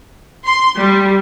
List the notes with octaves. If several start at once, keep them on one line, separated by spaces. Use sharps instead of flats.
C6
G3